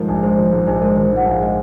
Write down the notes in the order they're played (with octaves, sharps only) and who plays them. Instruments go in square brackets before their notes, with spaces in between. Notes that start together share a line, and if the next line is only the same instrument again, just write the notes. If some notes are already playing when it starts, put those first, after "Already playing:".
Already playing: [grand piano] G#2 F3 [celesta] A#4
[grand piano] A#1
[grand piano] G#3 [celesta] C5
[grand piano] F3
G#2
[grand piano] A#1 [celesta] C5
[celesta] C5
[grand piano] G#3 [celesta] A#4
[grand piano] F3 [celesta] C5
[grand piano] G#2
[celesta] F#5
[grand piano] A#1 [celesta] F5
[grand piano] G#3 [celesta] D#5